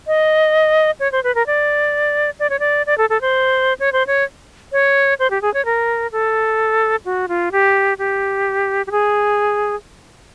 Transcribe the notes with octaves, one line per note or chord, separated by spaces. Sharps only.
D#5
C#5
C5
B4
A#4
D5
D5
C#5
D5
D5
A4
A4
C5
C#5
C5
C#5
C#5
C5
G4
G#4
C#5
A#4
A4
F#4
F4
G4
G4
G4
G#4